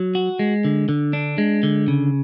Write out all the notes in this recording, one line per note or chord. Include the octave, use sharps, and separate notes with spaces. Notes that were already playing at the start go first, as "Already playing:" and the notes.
Already playing: F#3
F#4
G#3
D3
D3
D4
G#3
D3
C#3